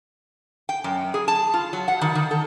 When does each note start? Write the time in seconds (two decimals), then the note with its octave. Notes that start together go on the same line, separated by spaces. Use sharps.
0.69 G5
0.84 F#2
1.14 G#4
1.28 A5
1.54 F4
1.73 F#3
1.88 F#5
2.01 D#3
2.15 D#3
2.31 A4